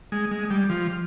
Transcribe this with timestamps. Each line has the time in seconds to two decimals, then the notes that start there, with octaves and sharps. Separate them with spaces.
0.12 G#3
0.31 G#3
0.50 G3
0.70 F3